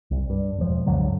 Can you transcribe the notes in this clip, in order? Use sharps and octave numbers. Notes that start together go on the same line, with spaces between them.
C2
G2
E1 F3
C#2 G2 D3 F#3